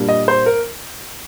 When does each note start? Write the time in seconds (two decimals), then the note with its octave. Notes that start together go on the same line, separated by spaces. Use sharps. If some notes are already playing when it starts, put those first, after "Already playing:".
Already playing: A#2 G3 D4
0.09 D#5
0.28 C5
0.46 A#4